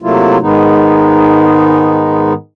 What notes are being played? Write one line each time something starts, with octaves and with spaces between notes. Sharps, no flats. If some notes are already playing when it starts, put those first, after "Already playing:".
C3 F#3 A3 A#3 E4 F4
G#2 D#3 G#3 B3 D#4